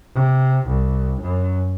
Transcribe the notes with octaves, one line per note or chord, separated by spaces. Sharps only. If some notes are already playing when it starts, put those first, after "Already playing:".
C3
C2
F#2